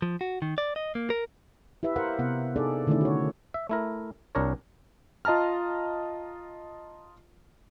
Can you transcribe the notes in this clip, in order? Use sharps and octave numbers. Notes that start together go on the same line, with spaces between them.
F3
F#4
D#3
D5
D#5
A#3
A#4
E4 G4 B4 E5
G4 A#4 C5 F5 F#5
C3 B3 F#5
D4 D#4 G#4 A4 D5
D3 D#3 A3 C#4 E4 D5
F#4 C#5
E5
A3 E4 A#4
C2 D4 A#4 C#5
F4 D#5 A5 A#5 F6